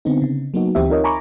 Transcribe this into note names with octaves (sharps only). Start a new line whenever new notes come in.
D3 B3 C4 D#4
C#3
F#3 A#3 B3 D#4 F#4
D2 E3 C4 G4 E5
D#4 F4 A#4 C#5 D#5
G#5 A#5 B5 C#6 D6